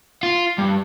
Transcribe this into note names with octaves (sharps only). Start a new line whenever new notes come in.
F4
G2